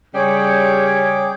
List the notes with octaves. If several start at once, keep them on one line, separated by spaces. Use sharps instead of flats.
C#3 G3 G#4 C#5 G5 D6